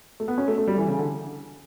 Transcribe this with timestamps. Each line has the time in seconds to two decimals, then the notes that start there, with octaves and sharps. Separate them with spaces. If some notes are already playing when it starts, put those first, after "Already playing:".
0.20 A3
0.28 B3
0.38 C#4
0.48 A3
0.58 A3
0.68 G3
0.78 E3
0.88 C#3
0.98 D3